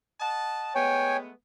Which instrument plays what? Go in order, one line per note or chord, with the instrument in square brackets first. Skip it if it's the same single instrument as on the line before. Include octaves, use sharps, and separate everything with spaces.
[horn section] D#5 F#5 A5
[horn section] G#3 A3 B3 [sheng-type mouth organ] C#5 G5 G#5